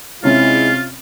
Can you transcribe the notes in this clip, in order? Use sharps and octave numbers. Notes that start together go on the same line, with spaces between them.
C3 G#3 C#4 E4 F4